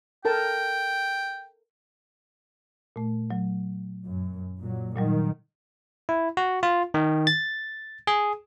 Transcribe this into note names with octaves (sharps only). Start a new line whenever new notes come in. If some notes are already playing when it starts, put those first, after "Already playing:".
A4 A#4 G5 A5
A#2 A3
F#3
F#2
A#2 F#3
A#2 D#3 F#3 G3
E4
F#4
F4
D#3
A6
G#4